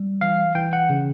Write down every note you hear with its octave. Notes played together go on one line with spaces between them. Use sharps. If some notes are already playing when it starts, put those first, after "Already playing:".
Already playing: G3
E3 F5
E3 G5
F#5
C#3